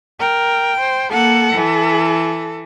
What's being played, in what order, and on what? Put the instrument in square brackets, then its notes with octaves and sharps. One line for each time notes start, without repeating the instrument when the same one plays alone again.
[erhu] A#4 [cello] G5
[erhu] C5
[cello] A#3 F#5 [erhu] A4
[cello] E3